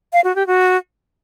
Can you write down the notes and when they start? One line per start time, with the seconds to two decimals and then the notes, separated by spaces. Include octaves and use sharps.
0.13 F5
0.24 F#4
0.35 G4
0.47 F#4